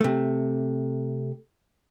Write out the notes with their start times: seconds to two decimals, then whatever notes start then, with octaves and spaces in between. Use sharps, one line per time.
0.01 C3 A3